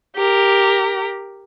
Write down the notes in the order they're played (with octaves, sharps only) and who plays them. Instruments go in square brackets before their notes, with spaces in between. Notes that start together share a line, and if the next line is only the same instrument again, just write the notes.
[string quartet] G4 A#4